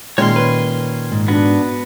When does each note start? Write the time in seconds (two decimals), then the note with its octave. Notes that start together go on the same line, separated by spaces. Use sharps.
0.18 A#2 D#3 G#3 C#4 C#5 C6
0.36 B4
1.12 G#2
1.28 B3 D4 F#4